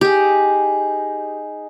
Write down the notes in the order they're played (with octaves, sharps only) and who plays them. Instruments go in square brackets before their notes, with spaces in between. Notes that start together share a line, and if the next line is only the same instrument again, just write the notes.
[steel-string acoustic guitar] D#4 G#4 [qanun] G4